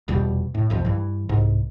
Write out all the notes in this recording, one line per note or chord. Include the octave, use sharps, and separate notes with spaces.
F1 E2 B2 G3
A2
B1 F2 F3
G2 E3
C2 G#2